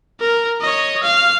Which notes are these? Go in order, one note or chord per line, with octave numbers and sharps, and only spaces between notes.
A#4
C#5 D#5
F5